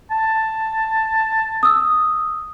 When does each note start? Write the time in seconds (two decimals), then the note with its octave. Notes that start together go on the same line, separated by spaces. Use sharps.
0.11 A5
1.63 D#6 E6